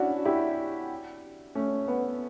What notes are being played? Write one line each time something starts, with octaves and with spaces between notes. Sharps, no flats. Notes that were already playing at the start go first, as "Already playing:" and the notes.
Already playing: C#4 D4 E4 F#4
E4 G4
A3 C#4
B3